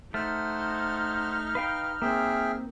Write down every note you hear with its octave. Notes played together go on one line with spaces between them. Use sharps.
A3 D#4 C5 F#5 F6
B4 F5 G5
A#3 C4 G#4 E5 G5